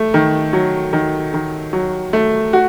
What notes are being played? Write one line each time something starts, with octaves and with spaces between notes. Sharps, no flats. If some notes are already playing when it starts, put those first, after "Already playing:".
Already playing: A3
D#3
F#3
D#3
D#3
F#3
A3
F#4